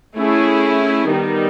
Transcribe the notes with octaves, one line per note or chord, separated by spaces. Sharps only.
A3 C#4 E4 G#4
D#3 G3 B3 D#4